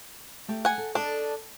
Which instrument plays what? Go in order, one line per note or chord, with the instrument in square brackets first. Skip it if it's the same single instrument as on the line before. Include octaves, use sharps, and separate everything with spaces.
[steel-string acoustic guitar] A3 G4
[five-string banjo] F#5 G#5
[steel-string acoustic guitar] A4
[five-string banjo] D4 [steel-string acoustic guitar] A4 D#5